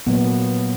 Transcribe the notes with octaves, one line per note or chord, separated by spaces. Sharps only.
A#2 F#3 A#3 B3